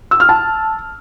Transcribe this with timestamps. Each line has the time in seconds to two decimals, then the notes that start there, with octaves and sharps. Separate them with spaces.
0.11 E6
0.20 F6
0.29 A5